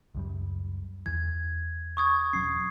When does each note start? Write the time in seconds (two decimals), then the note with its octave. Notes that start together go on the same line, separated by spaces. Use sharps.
0.15 C#2 F#2 G3
1.06 E2 E3 G#6
1.97 C#6 D#6 G#6
2.33 E1 F#3 C#4 C7